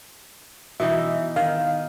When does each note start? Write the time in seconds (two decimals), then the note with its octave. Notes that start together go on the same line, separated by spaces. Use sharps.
0.80 B2 E3 D#4 E5
1.36 D#3 F5